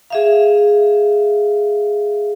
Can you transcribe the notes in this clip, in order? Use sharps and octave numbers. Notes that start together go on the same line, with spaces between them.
G#4 E5 F5